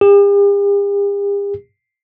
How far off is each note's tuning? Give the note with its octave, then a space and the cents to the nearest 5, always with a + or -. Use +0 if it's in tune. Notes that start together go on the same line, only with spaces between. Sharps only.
G4 +45